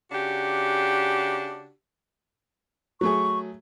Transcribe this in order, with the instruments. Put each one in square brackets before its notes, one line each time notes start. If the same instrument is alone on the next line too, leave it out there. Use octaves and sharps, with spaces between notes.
[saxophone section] C#3 D4 F#4 G4
[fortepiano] F#3 A3 G#4 [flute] C#6